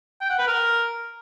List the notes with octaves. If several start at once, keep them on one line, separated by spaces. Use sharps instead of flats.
G5
F#5
B4
A#4